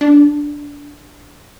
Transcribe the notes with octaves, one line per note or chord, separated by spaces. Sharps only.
D4